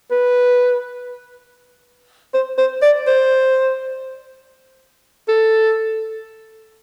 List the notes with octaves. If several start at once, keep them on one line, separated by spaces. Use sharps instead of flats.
B4
C5
C5
D5
C5
A4